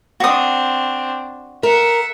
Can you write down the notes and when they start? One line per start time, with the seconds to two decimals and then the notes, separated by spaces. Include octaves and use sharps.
0.20 C4 D4 F#4 D#6
1.63 A#4 E5 F#5